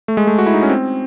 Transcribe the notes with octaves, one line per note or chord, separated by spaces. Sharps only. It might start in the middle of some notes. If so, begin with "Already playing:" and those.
A3
G#3
A3
F#4
E4
D#4
C#4
C4